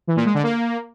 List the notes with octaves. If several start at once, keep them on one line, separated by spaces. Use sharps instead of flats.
E3
A#2
G#3
D3
A#3